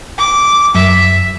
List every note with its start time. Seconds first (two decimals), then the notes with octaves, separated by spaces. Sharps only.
0.18 D6
0.75 F#2 E5